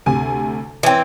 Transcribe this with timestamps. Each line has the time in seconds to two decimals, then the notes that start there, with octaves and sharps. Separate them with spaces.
0.06 D2 C3 G#5
0.83 E3 C4 C#5 G5